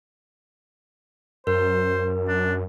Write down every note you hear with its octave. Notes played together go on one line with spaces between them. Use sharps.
F#2 A#4 C5
D4